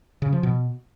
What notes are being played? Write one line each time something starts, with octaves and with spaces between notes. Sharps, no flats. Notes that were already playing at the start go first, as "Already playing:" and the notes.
C#3
F3
B2